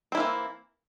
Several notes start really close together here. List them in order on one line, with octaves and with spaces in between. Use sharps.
C4 E4 A#3 E3